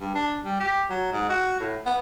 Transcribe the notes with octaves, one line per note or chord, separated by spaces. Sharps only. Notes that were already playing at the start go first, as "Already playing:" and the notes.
G2
D4
G3
G4
F#3
G#2
F#4
A2
B3